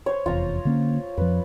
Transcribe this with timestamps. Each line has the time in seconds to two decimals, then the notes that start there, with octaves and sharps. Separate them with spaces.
0.06 C5 C#5
0.26 F1 E2 F4 A#5
0.65 D3 A#3 C#4
1.17 F2 F3 B4